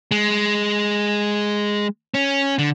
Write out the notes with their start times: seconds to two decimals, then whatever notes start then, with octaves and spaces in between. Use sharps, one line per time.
0.11 G#3
2.14 C#4
2.59 D3